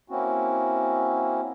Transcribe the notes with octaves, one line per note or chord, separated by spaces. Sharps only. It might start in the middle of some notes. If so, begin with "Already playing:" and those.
A#3 C4 C#4 E4 F#4